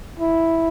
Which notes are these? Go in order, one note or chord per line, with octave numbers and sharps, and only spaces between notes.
E4